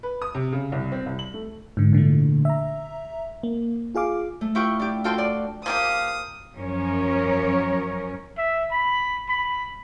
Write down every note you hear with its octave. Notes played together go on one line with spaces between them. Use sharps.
B4
D#6
C3
C#3
C2
C4
C2
F#7
A3
G#2 D3
A#2 D3 E3 A3
E5 A#5
A#3
F4 G#4 F5 D6
A3
E4 F4 G4 B4 G5 C#6
D4 G4
F4 F#4 A4 G5 A5 C6
D5
F3 A#3 G4 F5 D#6
F#2 F3 C#4 A#4 C#5
E5
B5
B5